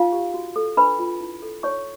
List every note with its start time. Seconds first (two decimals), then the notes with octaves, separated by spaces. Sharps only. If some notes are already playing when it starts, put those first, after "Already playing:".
Already playing: D#4 F4 F5
0.12 G4
0.34 F#4
0.56 A4
0.77 D4 B4 B5
0.99 F4
1.21 E4
1.42 A4
1.63 D#4 C#5 C#6